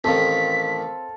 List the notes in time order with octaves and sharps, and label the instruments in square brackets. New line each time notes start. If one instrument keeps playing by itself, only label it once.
[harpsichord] A1 D#3 [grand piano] C4 [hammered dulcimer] A4 F5 [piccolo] B6